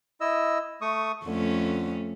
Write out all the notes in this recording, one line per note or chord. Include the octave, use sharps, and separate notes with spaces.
E4 D#5 E6
A3 C#6 D#6
F2 D3 A3 C#4